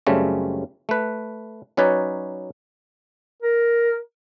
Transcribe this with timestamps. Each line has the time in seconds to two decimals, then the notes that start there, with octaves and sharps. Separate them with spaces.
0.07 F#2 C#3 G3 A3 C4 C#4
0.89 A3 B4
1.77 F#3 C#4 D#4 B4 C#5 D5
3.43 A#4